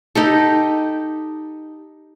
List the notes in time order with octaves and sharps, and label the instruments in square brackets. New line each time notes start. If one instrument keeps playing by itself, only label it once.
[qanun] D#4 G4 A4